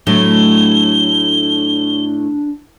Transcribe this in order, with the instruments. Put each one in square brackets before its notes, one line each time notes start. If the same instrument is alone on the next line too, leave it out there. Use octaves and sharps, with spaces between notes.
[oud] A2 [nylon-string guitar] F#3 [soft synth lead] D4 [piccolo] G7